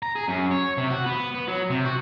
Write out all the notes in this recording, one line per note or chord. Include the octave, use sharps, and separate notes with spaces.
A#5
G#4
F#2
C#5
C3
F#4
B3
B3
F#3
C3
F#4